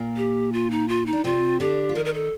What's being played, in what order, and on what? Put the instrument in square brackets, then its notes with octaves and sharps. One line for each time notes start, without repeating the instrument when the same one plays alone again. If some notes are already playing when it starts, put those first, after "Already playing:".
Already playing: [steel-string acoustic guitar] A#2 A#3
[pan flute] G4
F4
D#4
F4
D#4
[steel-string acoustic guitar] D4
[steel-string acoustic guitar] C3 C4 [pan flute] F4
[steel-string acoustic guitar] D3 D4 [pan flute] G4
[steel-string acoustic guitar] F4
[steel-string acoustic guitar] D#3 D#4 [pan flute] A#4
[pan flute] A#4
A4